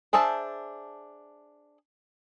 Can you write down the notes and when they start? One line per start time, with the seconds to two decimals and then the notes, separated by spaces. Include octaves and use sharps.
0.13 D4 G#4 C5 E5 A5